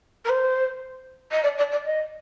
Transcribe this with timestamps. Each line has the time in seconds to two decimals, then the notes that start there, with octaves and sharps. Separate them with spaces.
0.25 A#4
0.29 C5
1.31 D#5
1.43 D5
1.58 D5
1.72 D5
1.85 D#5